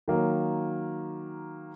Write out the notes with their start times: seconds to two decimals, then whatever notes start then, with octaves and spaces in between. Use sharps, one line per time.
0.08 D#3 F#3 A#3